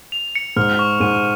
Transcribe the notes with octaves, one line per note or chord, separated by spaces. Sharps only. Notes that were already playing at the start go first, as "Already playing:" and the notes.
F7
C#7
G#2 F6
C#6
G#2 D#7